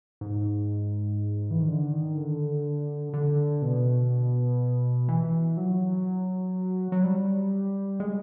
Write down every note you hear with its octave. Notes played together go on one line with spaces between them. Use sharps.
G#2
E3
D#3
D3
D#3
D3
D3
B2
E3
F#3
F#3
G3
G#3